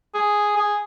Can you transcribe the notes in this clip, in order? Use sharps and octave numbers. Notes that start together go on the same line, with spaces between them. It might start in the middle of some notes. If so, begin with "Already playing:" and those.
G#4
G#4